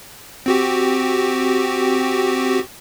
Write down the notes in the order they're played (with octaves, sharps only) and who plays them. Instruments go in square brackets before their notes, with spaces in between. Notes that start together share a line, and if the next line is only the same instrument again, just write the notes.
[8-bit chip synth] C4 F#4 G4